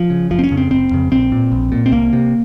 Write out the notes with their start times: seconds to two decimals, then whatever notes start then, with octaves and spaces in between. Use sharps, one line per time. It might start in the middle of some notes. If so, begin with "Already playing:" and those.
Already playing: F3
0.10 C#3
0.30 F#1 F3
0.39 C4
0.44 C#4
0.51 F2 C#3
0.57 C4
0.70 F#1 C4
0.91 F2 C#3
1.11 A#1 C4
1.32 A#2
1.52 A#1
1.72 A#2
1.86 C4
1.92 C2 A#3
2.13 C3